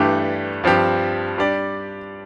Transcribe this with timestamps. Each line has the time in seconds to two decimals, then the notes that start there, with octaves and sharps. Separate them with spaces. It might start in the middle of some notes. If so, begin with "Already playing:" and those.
Already playing: G2 E3 A3 D4 G4
0.64 G2 F3 C4 G4
1.38 G3 D4 G4 D5